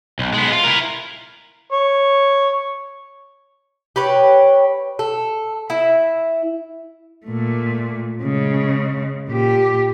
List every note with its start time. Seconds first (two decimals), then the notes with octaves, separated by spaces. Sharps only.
0.19 B1
0.34 G#3 B3
0.52 F4
0.64 E4 A#4
1.73 C#5
3.96 G4 B4 C#5
4.99 A4
5.70 E4 E5
7.26 A#2 A3
8.23 C#3 G#3
9.28 A#2 G4